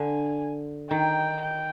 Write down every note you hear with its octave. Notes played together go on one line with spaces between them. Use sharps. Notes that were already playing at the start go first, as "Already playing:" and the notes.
Already playing: D3 G#5
D#3 G5
G5